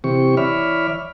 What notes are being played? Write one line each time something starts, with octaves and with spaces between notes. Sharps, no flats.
C3 E3 C4 G4 C#6
E3 C#5 D5 E5 B5 F6